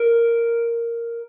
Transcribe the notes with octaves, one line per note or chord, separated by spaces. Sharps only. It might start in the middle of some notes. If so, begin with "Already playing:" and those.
Already playing: A#4